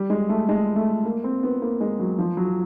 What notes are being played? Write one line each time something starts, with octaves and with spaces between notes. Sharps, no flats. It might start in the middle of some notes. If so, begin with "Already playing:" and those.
Already playing: G3
G#3
A3
G#3
A3
A#3
C4
B3
A#3
G#3
F#3
F3
F#3